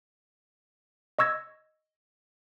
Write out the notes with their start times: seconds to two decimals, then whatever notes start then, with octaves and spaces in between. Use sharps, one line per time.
1.19 D#5 C#6 E6 G#6 A#6